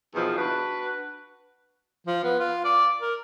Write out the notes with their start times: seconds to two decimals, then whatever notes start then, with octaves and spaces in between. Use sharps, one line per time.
0.15 E2 B2 D#3 F3
0.36 D4 F#4 B4
2.06 F3
2.24 B3
2.40 F4
2.65 D5
3.01 A#4